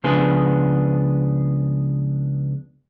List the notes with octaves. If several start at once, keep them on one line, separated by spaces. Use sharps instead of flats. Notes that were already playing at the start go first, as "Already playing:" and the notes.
C#2 F3 B3 D4 G#4